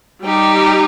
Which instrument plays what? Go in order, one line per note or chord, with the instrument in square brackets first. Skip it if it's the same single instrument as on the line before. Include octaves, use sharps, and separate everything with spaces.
[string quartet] G3 D#4 G4